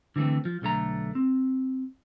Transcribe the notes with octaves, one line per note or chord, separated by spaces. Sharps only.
D3 E3 G3 A3 C4
F3
B1 D3 A3 A#5
C4